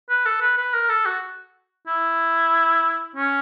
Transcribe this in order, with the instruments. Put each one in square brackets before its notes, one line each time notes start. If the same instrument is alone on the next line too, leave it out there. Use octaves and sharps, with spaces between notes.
[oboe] B4
A4
B4
B4
A#4
A4
F#4
E4
C#4